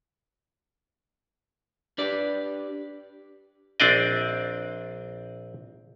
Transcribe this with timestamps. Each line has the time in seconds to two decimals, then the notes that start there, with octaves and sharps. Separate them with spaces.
1.98 D4 G4 B4 D5
3.80 A#1 C4 D4 D5 D#5